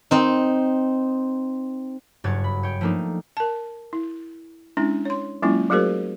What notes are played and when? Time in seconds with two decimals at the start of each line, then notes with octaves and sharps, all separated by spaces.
0.11 C4 D#4
2.24 F#1 G2 F#4 C#5 G#6 A6
2.44 B5
2.63 C#5 G5
2.81 F3 A3 A#3 D4 D#4
3.37 A#4 A5
3.93 E4
4.77 G#3 C#4 D4 E4
5.05 C#5 C6
5.42 F#3 G#3 A#3 C#4 E4 F4
5.70 F#3 A3 F#4 G#4 A#4 C5